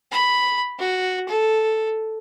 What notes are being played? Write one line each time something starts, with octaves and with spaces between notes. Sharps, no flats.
B5
F#4
A4